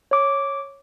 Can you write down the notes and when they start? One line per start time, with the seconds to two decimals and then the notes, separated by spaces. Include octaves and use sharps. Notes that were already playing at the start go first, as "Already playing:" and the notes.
0.11 C#5 D6